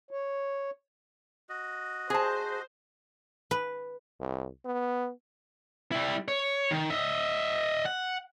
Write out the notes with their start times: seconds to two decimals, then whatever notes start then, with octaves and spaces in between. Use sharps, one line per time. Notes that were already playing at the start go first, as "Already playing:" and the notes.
0.11 C#5
1.49 F#4 D#5
2.10 G#4 C5 A5
3.51 B4
4.20 C2
4.65 B3
5.92 G3 E4
6.28 C#5
6.71 D#3
6.90 D#5 E5
7.86 F#5